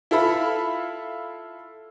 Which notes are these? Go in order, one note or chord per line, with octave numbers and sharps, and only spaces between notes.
E4 F4 A4 E5 B5